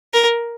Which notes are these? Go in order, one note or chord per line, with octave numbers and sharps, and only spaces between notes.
A#4